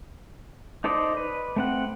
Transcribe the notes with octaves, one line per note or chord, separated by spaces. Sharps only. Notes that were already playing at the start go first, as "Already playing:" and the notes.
D#4 A4 C5 D5 D#5
B4
A3 C4 F#5